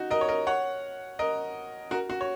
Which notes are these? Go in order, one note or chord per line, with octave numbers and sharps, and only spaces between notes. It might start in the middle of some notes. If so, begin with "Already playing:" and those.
Already playing: D#4 F#4
A#4 D#5
C#5
A#4 D#5
C#5 F#5
A#4 D#5
F#4 A#4
F#4
C#5